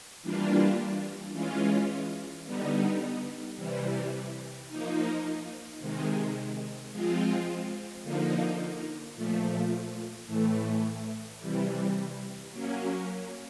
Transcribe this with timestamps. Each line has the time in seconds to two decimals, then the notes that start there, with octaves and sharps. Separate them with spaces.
0.22 E3 G3 A#3 D4 F4
1.33 E3 G#3 C#4 F4
2.45 D3 G3 B3 D#4
3.56 C3 E3 G3
4.69 F3 A#3 D#4
5.80 C3 D#3 G#3
6.92 F3 G#3 C4 F4
8.03 D3 F3 A#3 D#4
9.15 A#2 F3 A3
10.26 A2 E3 A3
11.38 C3 E3 G3
12.50 F#3 A#3 C#4